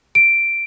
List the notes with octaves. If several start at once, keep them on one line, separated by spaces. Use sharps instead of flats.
D7